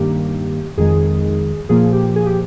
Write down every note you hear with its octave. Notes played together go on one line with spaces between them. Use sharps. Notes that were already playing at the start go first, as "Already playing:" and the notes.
Already playing: G2 D#3 A#3 G4
F2 D#3 G#3 G#4
A#2 F3 A#3 G#4
G4
G#4
G4